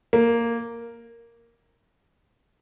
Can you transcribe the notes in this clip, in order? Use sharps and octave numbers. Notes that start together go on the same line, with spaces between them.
A#3